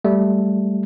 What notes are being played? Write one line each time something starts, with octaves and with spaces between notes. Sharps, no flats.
G3 A3